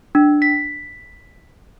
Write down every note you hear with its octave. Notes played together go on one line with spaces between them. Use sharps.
D4
B6